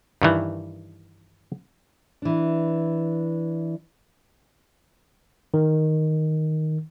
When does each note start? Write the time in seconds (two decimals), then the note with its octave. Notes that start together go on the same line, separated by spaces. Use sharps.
0.22 G2 D#3 E3
2.22 E3 D4
5.54 D#3